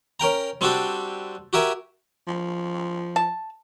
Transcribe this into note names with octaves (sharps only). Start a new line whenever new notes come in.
C#4 A#4 G5 A#5
G3 C4 D4 F#4 G4 A4
F#4 G4 A#4 E5 G#5
F3
A5